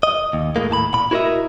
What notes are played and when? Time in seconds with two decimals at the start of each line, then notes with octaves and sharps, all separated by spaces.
0.03 D#5
0.33 D#2
0.56 A2 G#3 A#3
0.70 D#2 A2 A5 B5
0.94 A#2 B5
1.11 E4 F#4 A#4 C#5 D#5 E5